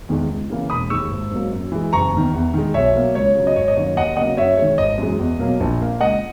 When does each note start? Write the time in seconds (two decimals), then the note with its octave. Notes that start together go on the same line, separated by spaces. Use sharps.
0.09 E2 D#3 G#3
0.29 C#2
0.50 C#3 E3 A#3
0.70 E1 B5 D#6
0.90 D#2 D#3 G#3 C#6 E6
1.11 G#1
1.31 G#2 F#3 A#3
1.52 F#2
1.72 E3 G#3
1.93 F#1 A#5 C#6
2.13 E2 D#3
2.34 E2
2.54 D#3 G#3
2.74 B1 C#5 E5
2.95 B2 F#3 A#3
3.15 C#2 C#5
3.35 C#3 F#3
3.47 D#5
3.56 G#1 C#5
3.68 D#5
3.77 F#2 D#3 F#3 A#3 C#5
3.96 D#2 D#5 F#5
4.17 C#3 F#3 A#3 D#5 F#5
4.37 F#2 C#5 E5
4.57 D#3 G#3 C#5
4.78 G#1 D#5
4.98 F#2 E3 G#3
5.19 E2
5.39 B2 F#3 A#3
5.60 A#1
5.80 A#2 A#3
6.01 C#2 D#5 F#5